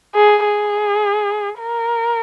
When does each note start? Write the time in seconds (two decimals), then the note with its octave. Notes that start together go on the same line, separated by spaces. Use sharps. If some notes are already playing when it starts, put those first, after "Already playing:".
0.15 G#4
0.45 G#4
1.60 A#4